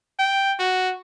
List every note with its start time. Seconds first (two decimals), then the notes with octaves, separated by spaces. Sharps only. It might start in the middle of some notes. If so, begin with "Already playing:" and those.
0.19 G5
0.59 F#4